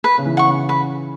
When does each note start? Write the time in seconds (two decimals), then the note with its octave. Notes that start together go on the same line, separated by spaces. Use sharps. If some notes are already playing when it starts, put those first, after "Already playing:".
0.04 B4
0.18 C#3
0.26 E3
0.37 F#5 C#6
0.47 C#3
0.69 B4